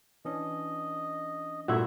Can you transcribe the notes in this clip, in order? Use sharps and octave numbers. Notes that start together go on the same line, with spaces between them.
E3 C#4 D4 D#5
G2 A#2 A3 E4 F#4 E5